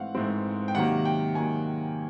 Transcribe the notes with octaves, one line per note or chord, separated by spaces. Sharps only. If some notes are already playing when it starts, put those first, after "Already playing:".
Already playing: G#2 E3 A3 C4 F5 F#5
G#2 E3 A3 C4
G5
C3 D#3 F#3 A#3 F#5
G5
C3 D#3 F#3 A#3 G#5